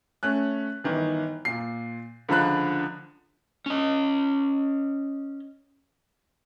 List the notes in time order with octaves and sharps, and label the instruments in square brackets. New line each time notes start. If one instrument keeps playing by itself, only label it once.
[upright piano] A3 C#4 F#6
G1 D#3 E3
A#2 C7
C#2 D3 F3 B5 F#6
[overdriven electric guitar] C#4 D#5